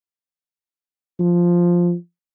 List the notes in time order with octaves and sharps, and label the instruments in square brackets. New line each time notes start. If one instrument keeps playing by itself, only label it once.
[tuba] F3